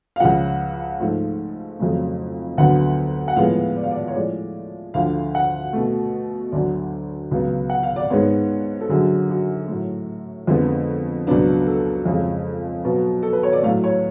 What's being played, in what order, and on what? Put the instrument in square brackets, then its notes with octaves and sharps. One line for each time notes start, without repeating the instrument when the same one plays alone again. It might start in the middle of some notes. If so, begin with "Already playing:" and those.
[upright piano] F5
C#2 C#3 F3 F#5
G#2 F3 A3
F2 C#3 F#3 A3
D2 D3 F#3 B3 F#5
F#5
A2 F3 G#3 B3 F5
D5
F5
D5
C#5
A2 F3 G#3 D5
D2 D3 F3 F5
F#5
B2 A3
D2 D3 F#3 D5
C#2 C#3 F#3 B3
F#5
F5
D5
G#2 G#3 B3 C#5
A4
F#2 D3 F#3 G#4
F#4
A2 F#3 A3
F2 D3 F3 G#3 B3
C#2 B2 F#3 B3 D4
A4
F2 C#3 F3 G#3
B2 F#3 B3
A4
B4
C#5
D5
A2 F#3 A3 F5
C#5